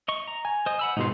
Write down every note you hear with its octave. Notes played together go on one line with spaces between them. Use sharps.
D#5 C#6
A#5
G#5
C5 D#5
F#5 B5 E6
G#2 B2 D#4 F4 C6